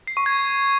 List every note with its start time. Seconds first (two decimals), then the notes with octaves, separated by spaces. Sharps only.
0.07 C7
0.17 C#6
0.26 G#6